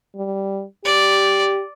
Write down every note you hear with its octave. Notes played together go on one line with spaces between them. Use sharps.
G3
G4 D5